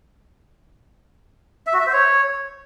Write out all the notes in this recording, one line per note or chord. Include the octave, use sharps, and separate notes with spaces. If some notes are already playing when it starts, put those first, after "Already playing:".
E5
F#4
E5
C5
C#5